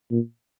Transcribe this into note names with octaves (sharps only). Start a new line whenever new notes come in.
A#2